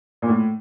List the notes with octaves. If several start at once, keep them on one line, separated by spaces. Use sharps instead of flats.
A#2
A2